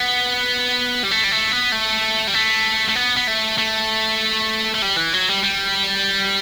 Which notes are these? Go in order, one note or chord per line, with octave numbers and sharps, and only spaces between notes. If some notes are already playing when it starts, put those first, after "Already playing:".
Already playing: B3
G3
A3
G3
A3
B3
A3
G3
A3
A3
B3
B3
A3
A3
A3
G3
E3
F#3
G3
G3